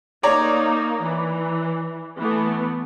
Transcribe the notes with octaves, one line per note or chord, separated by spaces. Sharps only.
A#3 D#4 C#5 D5 A#5
E3
E3 A3 B3